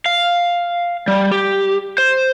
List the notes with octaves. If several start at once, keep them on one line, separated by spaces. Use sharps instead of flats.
F5
G3
G4
C5